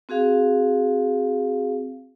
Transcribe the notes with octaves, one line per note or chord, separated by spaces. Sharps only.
C4 F#4 G#4 F5